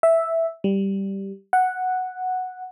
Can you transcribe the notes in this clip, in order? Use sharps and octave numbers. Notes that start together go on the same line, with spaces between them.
E5
G3
F#5